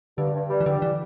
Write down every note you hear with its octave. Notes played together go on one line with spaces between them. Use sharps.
G2 D3
G2
G3
E3
D3 G3
E3